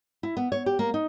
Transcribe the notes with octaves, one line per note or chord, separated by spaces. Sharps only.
E4
B3
C#5
G4
A#3
D#4